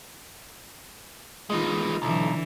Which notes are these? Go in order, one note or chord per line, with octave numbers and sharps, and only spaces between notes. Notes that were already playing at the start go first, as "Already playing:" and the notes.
E3 G#3 D#4 F4
B1 D3 E3